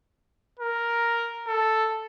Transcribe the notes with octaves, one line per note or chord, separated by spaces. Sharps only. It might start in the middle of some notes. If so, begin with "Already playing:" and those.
A#4
A4